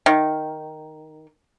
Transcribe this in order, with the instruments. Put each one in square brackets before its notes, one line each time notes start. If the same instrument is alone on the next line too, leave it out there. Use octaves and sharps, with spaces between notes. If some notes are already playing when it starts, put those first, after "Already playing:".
[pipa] D#3